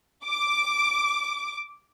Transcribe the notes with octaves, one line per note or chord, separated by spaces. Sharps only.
D6